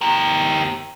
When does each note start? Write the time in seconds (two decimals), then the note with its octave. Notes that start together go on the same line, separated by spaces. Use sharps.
0.01 G4 A#4